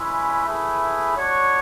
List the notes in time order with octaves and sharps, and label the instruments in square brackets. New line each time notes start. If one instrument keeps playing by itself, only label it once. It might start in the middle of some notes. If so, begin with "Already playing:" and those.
Already playing: [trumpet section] G#3 C#4 E4 B4
A3 E4 G#4 B4
D4 F#4 C#5